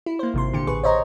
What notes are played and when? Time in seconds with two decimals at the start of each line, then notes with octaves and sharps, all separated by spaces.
0.06 E4
0.19 A#3 C5
0.34 G#1 C3 C6
0.53 A#2 D3 G4 C#7
0.67 A1 G#4 B4 C#6
0.84 C5 C#5 D#5 A#5